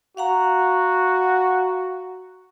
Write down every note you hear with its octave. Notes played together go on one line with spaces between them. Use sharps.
F#4 F5 F#5 A#5